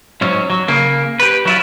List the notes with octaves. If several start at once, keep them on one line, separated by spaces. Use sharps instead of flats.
G#2 F#3 C#4
F#3
C#3 A#3
G4 B4
F#3 E4 F4